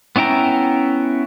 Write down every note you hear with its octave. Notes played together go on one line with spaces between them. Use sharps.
B3 C#4 E4 G5 A#5